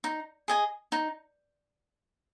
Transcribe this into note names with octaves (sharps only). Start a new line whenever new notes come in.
D#4
G#4 D#5 G#5
D#4